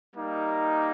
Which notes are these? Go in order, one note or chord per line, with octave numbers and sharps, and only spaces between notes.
G3 A#3 D#4